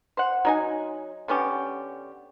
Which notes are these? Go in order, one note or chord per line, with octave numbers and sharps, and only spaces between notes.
C5 F#5
F#3 D#4 G#5
D3 B3 C#4 G4